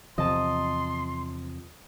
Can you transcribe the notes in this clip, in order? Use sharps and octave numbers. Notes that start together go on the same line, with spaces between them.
E2 C3 F3 D#5 A5 C6